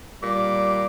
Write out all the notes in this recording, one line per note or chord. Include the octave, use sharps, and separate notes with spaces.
A#2 G3 D6